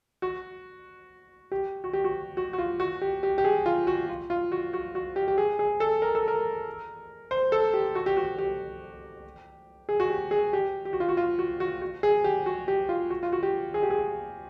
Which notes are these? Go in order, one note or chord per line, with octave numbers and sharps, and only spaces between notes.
F#4
G4
F#4
G4
F#4
F#4
F#4
F4
F#4
G4
G4
G4
G#4
F4
F#4
F4
F4
F#4
F#4
F#4
G4
G4
G#4
G#4
A4
A#4
A4
A#4
C5
A4
G4
F#4
G4
F#4
G4
G#4
F#4
G4
G#4
G4
G4
F#4
F4
F#4
F4
F#4
F#4
F#4
G#4
G4
F#4
G4
F4
F#4
F4
F#4
G4
G#4
G4
G#4